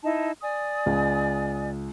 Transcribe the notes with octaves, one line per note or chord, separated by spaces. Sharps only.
D#4 E4 A5
D5 G#5 D#6
C#2